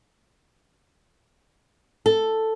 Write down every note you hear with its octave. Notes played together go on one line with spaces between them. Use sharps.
A4